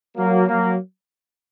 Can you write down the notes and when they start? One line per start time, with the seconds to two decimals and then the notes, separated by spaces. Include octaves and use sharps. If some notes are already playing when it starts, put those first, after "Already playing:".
0.16 F#3 A#3
0.46 F#3 A#3